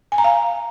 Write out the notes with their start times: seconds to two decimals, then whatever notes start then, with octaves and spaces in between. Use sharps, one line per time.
0.12 G#5
0.18 A#5
0.24 F5